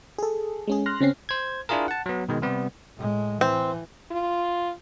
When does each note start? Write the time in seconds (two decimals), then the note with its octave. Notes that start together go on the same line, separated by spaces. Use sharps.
0.19 G#4 A4
0.67 G#3 C#4 G#4
0.86 C6 F6 F#6 A#6
1.00 C#3 C4 C#4 C7
1.29 C5 G#6
1.69 D4 E4 F4 G#4 A#4
1.88 F#5 A5
2.06 F#3 B3
2.29 B2 D#3 G#3
2.42 C3 G3 B3
2.97 A2 G#3
3.41 E3 C4
4.11 F4